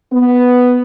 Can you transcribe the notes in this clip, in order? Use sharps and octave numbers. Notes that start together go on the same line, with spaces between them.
B3